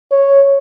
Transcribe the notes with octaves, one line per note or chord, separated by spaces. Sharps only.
C#5